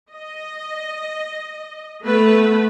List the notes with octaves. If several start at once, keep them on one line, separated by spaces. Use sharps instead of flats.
D#5
A3 B3 B4